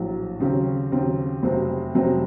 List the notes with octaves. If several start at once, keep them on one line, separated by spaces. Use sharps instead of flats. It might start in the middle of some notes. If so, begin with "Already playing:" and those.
Already playing: A#1 A2 F#3
D#2 C#3 F#3 C4
D#2 C#3 F#3 C4
F1 F2 C3 F#3 C4
F1 F2 C3 F#3 C4